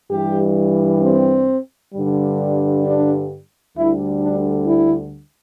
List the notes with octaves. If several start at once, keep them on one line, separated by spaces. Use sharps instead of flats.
G2 E3 G3 G4
C4
G2 D3 G3
D4
D2 D3 G3 E4
D4
E4